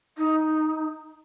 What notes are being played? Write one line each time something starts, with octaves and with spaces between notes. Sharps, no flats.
D#4